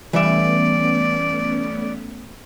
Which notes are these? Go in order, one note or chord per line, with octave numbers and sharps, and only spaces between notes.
E3 G3 A3 B3 C#4 D5 E5